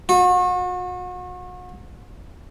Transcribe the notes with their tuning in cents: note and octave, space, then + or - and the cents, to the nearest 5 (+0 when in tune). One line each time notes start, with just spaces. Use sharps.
F#4 -35